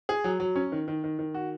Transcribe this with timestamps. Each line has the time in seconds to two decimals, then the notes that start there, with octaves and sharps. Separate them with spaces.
0.09 G#4
0.24 F#3
0.40 F#3
0.56 C#4
0.72 D#3
0.88 D#3
1.04 D#3
1.19 D#3
1.34 F#4